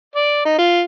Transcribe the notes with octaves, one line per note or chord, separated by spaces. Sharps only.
D5
D#4
F4